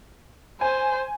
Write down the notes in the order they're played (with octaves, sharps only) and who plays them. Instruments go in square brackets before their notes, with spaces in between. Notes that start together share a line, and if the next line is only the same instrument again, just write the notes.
[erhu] C5 [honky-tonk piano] G#5